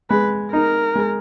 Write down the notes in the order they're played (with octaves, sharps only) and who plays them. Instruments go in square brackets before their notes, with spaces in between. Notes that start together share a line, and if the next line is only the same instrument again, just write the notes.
[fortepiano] G#3 [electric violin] B4
[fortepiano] D#4 [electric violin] A#4
[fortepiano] G#3